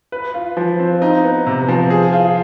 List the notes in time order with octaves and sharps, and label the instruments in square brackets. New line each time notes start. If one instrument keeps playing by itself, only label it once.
[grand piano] B4
F4
F3
C4
D#4
B3
C3
F3
G#4
F4